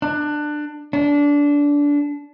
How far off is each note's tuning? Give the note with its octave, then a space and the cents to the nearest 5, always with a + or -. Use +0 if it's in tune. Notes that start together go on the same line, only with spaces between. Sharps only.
D4 +20
D4 -20